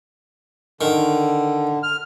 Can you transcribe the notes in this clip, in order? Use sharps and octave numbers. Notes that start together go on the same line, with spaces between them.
D3 D#3
F6